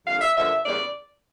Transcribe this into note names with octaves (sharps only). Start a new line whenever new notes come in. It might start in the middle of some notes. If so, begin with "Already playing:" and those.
F2 D3 G3 A#3 F5
E5
G2 D3 F3 A#3 E5
E2 C#3 G3 A#3 D5